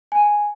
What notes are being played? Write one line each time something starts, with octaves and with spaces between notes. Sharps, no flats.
G#5